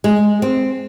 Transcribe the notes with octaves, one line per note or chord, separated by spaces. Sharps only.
G#3
C4